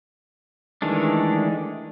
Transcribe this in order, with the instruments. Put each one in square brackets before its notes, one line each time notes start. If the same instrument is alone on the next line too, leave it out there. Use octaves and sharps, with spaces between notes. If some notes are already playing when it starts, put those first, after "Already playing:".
[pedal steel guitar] D#3 E3 G#3 A3 D4